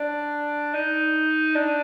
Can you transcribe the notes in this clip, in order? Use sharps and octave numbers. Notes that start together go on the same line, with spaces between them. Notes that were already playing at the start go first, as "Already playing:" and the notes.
Already playing: D4
D#4
D4